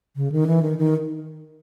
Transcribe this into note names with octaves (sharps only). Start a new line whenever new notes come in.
C#3
D#3
E3
D#3
D#3